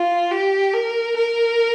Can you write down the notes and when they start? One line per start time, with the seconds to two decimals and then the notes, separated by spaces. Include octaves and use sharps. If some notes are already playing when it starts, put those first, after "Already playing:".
Already playing: F4
0.31 G4
0.74 A#4
1.16 A#4